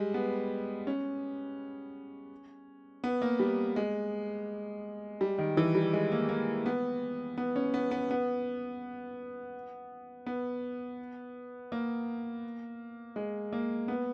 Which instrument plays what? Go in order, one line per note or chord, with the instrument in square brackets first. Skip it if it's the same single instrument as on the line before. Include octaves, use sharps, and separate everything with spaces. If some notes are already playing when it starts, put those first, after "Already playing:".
Already playing: [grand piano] G3 G#3
B3
C#4
B3
A#3
G3
G#3
G3
D#3
E3
G3
G#3
A#3
A#3
B3
B3
C#4
B3
B3
B3
B3
A#3
G#3
A#3
B3